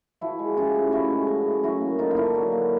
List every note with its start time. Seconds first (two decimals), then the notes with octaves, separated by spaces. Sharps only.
0.21 F3 E4 F#4
0.39 G#3
0.57 C#4 F4 G4
0.75 A2
0.92 F3 E4 F#4
1.10 G#3
1.28 C#4
1.46 A2
1.63 F#3 E4 F#4
1.81 A#3
1.99 D3 D#4 F4
2.11 F4
2.17 D3 D4 E4
2.35 F#3
2.52 A#3